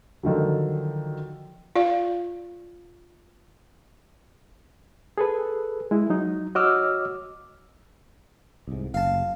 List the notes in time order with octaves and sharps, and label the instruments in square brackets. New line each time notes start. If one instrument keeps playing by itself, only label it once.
[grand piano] D3 D#3 F3 F#3
[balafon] F4 D5 F5
[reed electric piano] G#4 A4 B4
G#3 E4
F#3 D#4
F#4 C#5 D#5 D6 E6 F6
[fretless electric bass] C2 G#2
[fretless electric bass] F#1 [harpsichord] F5 A5